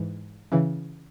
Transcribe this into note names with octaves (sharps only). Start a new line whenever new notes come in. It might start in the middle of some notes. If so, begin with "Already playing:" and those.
Already playing: G#2 E3
C#3 E3